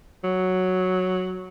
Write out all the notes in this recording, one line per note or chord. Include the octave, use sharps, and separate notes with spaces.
F#3